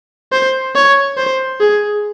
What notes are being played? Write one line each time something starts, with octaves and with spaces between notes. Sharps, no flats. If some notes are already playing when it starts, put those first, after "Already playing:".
C5
C#5
C5
G#4